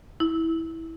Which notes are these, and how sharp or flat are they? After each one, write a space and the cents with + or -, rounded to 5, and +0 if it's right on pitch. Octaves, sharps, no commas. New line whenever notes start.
E4 -15